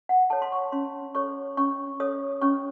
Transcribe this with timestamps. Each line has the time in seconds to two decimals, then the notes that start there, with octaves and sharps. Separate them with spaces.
0.09 F#5
0.30 A4 C#5 A5
0.42 C6
0.52 C#6
0.72 C#4 C6
1.15 A4 C#5 C#6
1.57 C#4 C#6
2.00 A4 C#5 D#6
2.41 C#4 C#6